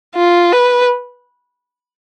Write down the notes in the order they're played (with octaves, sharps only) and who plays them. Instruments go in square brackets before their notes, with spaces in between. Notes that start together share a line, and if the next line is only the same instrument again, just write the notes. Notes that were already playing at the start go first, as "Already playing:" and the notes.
[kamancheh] F4
B4